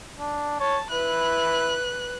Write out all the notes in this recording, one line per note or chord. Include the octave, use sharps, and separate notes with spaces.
D4
C#5 A5
E4 B4 F#6